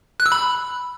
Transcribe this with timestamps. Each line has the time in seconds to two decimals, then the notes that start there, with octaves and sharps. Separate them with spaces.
0.20 F#6
0.26 E6
0.32 B5